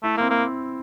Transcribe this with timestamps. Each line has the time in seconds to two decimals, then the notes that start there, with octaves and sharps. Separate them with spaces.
0.03 A3 E4
0.17 A#3 C4
0.30 A#3